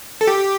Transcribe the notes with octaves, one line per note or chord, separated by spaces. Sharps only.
A4
G4